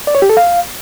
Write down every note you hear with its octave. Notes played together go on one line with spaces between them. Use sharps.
D5
C#5
G4
A4
F5